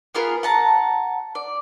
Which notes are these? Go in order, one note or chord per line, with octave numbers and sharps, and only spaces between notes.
B3 F4 G#4 A#4
F#5 A5 A#5
D5